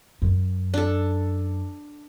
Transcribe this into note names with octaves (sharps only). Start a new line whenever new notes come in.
F#2
D4 A4